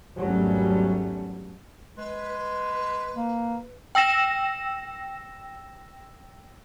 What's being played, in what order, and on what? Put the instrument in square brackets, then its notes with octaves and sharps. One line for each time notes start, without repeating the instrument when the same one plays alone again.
[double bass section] G#1 E2 F#3 G3 A3 C#4
[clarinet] G#3 [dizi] B4
[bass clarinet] A#3
[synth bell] G5 E6 A#6 E7